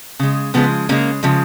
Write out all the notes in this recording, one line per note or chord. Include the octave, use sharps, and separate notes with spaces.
C#3 G#3
C#3 F3 G#3 B3
C#3 F3 G#3 A#3 C#4
C#3 F3 G#3